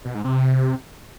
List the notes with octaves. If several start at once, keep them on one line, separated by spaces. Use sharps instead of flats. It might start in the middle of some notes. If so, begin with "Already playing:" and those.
B2
G#2
C3